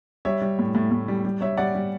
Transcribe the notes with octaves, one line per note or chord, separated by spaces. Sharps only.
G3 C#5 E5
G3
A2
A2
A2
G3
G3
G3 C#5 E5
G3 D5 F#5
G3